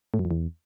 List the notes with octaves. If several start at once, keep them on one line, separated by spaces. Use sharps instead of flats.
A2
F#2
F2
E2